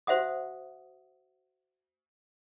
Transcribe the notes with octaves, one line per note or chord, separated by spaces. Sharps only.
F#4 C5 E5 F#5 D#6